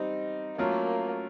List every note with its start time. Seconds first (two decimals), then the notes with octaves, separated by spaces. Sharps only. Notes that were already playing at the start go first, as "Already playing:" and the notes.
Already playing: G3 C4 D#4
0.58 F#3 A3 A#3 C#4 F4 A#4